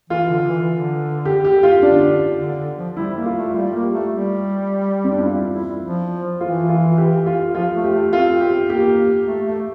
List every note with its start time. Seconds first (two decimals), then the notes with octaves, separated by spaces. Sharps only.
0.10 E3 F4
0.29 D3
0.43 D3
0.48 E3
0.68 D3
1.25 G4
1.45 G4
1.63 F4
1.82 D3 D4
2.39 D3
2.58 D3
2.78 F3
2.97 G3 E4
3.16 A#3
3.26 F4
3.36 A3
3.54 G3 F4
3.74 A#3
3.83 G4
3.92 A3
4.12 G3
5.04 C4
5.12 D4
5.18 E4
5.26 F4
5.55 E4
5.83 F3
6.41 E3 F4
6.69 F4
6.98 G4
7.26 F4
7.55 F3 F4
7.74 A3
7.84 G4
7.93 A3
8.12 C4 F4
8.41 G4
8.69 A#3 G4
9.27 A3
9.46 A3